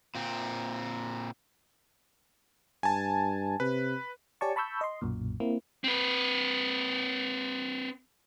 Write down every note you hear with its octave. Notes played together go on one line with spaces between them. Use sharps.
A#2 C4
G2 G#5 A5
C3 B4
G4 C#5 D5 G#5 A5 C#6
A5 B5 C#6 E6 G6
D#5 C6
B1 F#2 A#2
A#3 C4 E4
C4 B4